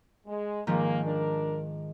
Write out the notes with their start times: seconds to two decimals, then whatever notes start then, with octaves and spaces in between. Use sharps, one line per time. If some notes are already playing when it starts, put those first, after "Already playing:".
0.27 G#3
0.67 G#2 D#3 F3 A#3
1.05 D4 A#4